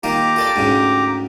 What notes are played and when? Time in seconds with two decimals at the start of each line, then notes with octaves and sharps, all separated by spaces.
0.03 D#3 A#3 F4 G4 A#5 D6
0.36 F4 A4 D5
0.56 D2 G#2 C#3